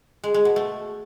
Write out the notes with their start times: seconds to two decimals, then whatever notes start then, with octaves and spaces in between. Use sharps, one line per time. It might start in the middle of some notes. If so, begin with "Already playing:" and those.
0.24 G#3
0.34 G#3
0.45 B2
0.56 A3